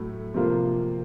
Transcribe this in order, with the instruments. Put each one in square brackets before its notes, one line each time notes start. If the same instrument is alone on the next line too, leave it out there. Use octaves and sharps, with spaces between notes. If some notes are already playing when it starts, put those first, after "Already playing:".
Already playing: [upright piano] A2 F#3 A3
C3 F3 A#3 F4